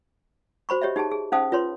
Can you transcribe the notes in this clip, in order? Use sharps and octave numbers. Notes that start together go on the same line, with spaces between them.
F#4 C5 B5 C#6
G4 C#5 D#5 E5
D#4 G4 G#4 A5
G#4
C#4 D#4 C5 F5 A5 D#6
F4 B4 C#5 C6